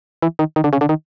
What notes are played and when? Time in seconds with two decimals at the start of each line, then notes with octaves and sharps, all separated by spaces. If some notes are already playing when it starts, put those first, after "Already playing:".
0.22 E3
0.39 D#3
0.56 D#3
0.64 D3
0.73 C#3
0.81 D3
0.89 D#3